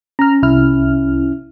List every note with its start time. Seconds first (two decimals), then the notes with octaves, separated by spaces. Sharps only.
0.19 C#4 A#5 F6
0.42 C2 E4 F6